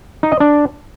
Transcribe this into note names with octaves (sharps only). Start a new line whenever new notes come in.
D#4
D#5
D4